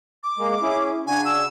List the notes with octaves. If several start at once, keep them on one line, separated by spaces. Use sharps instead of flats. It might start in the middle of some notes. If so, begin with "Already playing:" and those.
D6
G#3 A#3
C#4 E4 G#4
C#3 D4 F#4 G#5
E6